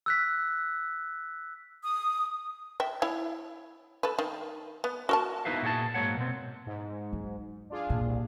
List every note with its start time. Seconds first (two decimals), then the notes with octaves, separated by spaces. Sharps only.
0.06 E6 F#6 B6
1.84 D#6
2.80 E5 G5
3.02 E4 C#5
4.03 A4 B4
4.19 D#3
4.84 B3
5.09 F#4 A#4 A5
5.45 B3 D#4 E4 B4 E5 F5
5.63 A#2 F#4 G#4 B4 A5
5.94 G#2 F#3 A#3 C#5 F#5
6.17 B2 C4
6.66 G#2
7.13 F#3
7.70 D4 F4 G#4
7.90 A#2
8.05 C2